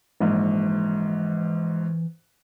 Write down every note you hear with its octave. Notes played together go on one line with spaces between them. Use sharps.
A#1 G#2 E3